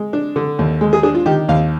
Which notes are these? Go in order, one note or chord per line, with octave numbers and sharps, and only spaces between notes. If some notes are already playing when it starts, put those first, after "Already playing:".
Already playing: G#3
D4
D3
D#2
G#3
G#4
D4 G#4
F4
D#3 G4
D#2 F5